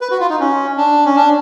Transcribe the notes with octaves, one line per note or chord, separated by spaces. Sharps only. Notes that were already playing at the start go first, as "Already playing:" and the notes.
B4
F#4
F4
D#4
C#4
D4
C#4
D4